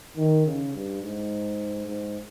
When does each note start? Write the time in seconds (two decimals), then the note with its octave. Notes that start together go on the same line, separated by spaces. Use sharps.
0.17 D#3
0.46 C#3
0.74 G2
1.02 G#2
1.87 G#2